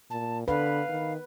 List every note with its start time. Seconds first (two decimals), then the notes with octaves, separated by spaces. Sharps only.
0.10 A#2 A5
0.48 D3 B4 F5
0.89 D#3